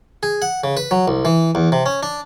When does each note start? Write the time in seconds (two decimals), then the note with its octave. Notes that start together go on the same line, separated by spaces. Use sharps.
0.23 G#4
0.42 F#5
0.64 C#3
0.77 B4
0.91 F#3
1.08 C2
1.25 E3
1.55 E2
1.72 C3
1.86 C#4
2.03 D4